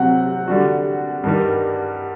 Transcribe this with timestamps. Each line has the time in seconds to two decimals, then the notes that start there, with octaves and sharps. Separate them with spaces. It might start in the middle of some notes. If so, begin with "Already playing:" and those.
Already playing: C3 F#3 C4 F#5
0.48 D3 G3 D4 F#4
1.24 G2 D#3 G3